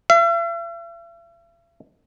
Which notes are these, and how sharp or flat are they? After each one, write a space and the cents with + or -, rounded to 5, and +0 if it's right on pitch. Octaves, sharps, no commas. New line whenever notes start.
E5 +45